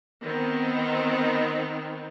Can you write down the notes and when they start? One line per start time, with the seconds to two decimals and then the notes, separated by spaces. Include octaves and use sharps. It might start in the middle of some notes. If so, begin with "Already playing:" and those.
0.23 D#3 B3 C4